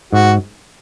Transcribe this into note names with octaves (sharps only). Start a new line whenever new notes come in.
G#2 F#4